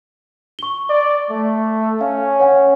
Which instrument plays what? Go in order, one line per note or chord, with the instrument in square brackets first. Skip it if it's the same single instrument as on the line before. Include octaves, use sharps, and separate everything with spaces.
[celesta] C#6 G7
[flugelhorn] D5
A3
[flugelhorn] C#4 [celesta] F5
[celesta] C#5 F#5 G#5